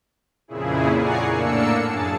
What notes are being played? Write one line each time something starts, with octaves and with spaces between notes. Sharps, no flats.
F2 A#2 C#3 E4 G#4
D5 F#5 G#5 A#5 C#6 C7
A2 A#3 D4 E6 C#7
F#2 G#4 A5 A6